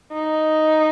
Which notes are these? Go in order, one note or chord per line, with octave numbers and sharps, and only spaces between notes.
D#4